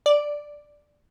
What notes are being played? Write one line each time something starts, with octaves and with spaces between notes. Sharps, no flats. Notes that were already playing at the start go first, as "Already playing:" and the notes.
D5